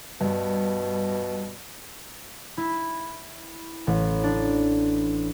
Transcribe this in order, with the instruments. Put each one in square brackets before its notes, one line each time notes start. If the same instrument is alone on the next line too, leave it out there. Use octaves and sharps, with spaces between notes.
[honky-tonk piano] G2 [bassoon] B2
[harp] E4
A1
D4